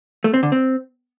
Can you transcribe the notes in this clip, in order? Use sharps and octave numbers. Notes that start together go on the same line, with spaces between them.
A3
C4
D3
C4